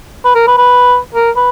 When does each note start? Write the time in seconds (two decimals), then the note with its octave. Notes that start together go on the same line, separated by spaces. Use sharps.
0.25 B4
0.35 A#4
0.47 B4
0.58 B4
1.15 A#4
1.36 B4